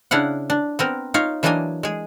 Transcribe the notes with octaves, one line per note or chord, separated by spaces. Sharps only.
C#3 D4 E4 F5 F#5
D4
B3 C4 A#4
D#4 F4 C#5 F5
E3 F#3 A#3 D4 D#5 G#5
G#3 G#4